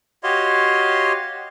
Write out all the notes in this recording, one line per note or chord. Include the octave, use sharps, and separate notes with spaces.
F#4 G4 C#5 D#5 F5 C6